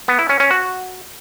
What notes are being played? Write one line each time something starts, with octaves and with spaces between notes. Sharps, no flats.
B3
E4
C#4
C#4
F#4